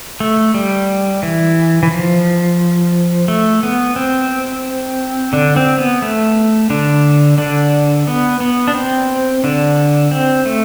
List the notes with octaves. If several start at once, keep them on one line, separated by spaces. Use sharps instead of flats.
A3
G3
E3
E3
F3
A3
B3
C4
D3 D4
C4
B3
A3
D3 D4
D3 D4
B3
B3
D4
C4
D3 D4
C4
A3